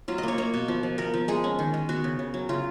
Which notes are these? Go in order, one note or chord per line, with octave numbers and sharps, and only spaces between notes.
F#3 F4
D#5
A#3 C#5
A#3 C#5
B2
F3
F3
B3 A#4
F3
G#3 G#4
C#4
D#3
G#3
B3 F#4
C#3
C#3
F#3
C#3 F4